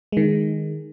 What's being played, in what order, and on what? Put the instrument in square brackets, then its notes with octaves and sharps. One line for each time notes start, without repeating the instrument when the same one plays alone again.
[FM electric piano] D#3 G#3